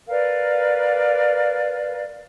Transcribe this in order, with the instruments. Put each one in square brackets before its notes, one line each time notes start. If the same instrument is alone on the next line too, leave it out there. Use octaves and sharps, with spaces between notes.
[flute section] A#4 B4 D5 F5